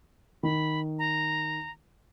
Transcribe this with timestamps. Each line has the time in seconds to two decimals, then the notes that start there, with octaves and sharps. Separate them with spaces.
0.43 D#3 B5
0.99 A#5